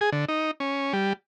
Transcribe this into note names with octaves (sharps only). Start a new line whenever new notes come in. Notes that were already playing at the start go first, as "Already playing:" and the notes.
G#4
D3
D#4
C#4
G3